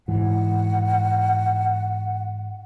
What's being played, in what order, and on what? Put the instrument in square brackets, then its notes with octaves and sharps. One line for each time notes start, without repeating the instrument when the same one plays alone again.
[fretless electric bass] G#2 E3 [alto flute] F#5